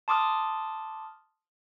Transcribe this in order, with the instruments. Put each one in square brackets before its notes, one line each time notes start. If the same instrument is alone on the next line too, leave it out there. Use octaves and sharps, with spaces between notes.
[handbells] A5 C6 D6 D#6 F6